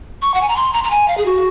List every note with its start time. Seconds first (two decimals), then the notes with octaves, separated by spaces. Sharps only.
0.22 C#6
0.34 F#5
0.41 G#5
0.48 A#5
0.56 C6
0.73 A#5
0.84 A#5
0.91 G#5
1.08 F5
1.17 G#4
1.25 F#4